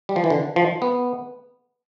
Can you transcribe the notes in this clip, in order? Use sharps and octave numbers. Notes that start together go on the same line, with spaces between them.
G3
F3
E3
D3
F3
B3